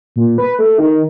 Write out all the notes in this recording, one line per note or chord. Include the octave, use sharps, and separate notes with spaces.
A#2
B4
A3
D#3